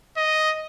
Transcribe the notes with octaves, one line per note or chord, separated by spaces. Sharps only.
D#5